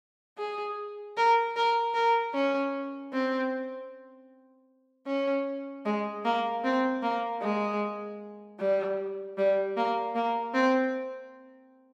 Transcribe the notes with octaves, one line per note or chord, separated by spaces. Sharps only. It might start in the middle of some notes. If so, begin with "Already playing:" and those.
G#4
A#4
A#4
A#4
C#4
C4
C#4
G#3
A#3
C4
A#3
G#3
G3
G3
A#3
A#3
C4